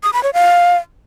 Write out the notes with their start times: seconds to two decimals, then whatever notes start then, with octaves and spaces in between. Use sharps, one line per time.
0.03 D#6
0.13 B5
0.23 C#5
0.34 F5